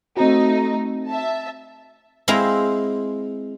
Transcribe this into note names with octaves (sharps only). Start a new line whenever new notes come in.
A3 C4 D#4 F#4
E5 A5
G#3 C4 E4 C5 F5 A#5